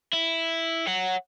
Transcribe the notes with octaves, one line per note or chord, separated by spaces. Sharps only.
E4
C#5 F#5